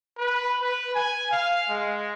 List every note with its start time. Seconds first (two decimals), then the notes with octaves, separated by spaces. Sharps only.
0.18 B4
0.62 B4
0.94 G#5
1.31 F5
1.68 G#3